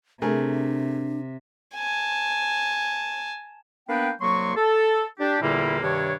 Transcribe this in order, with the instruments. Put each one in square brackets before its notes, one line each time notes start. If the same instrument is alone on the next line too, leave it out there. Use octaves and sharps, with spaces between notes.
[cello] C3 [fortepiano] A3 G#4 A#4 [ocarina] D4
[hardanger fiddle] G#5 A5
[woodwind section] A#3 B3 D4 B4 G5
C2 F#3 A#3 C6 C#6
A4
D4 G4
E2 A#2 D3 G3 A#3 E4
G2 C3 D#3 D4 C#5